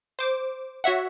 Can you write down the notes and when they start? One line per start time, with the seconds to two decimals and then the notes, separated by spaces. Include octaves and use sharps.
0.19 C5 D6
0.84 F#4 C#5 E5 F#5